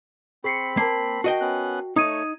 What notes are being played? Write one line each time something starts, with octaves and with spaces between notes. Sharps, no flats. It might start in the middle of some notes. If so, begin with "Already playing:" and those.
C4 G#4 B5 C7 C#7
A#3 A#4 A5 C7
F#4 D#5 G5
B3 C#4 F#6
A3 D#4 C#5 D#6 G#6 D#7